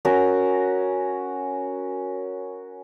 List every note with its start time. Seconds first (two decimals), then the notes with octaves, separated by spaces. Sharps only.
0.05 C#4 F#4 A#4